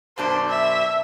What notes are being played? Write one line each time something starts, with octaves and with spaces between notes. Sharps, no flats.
F#2 B2 D4 C5
E5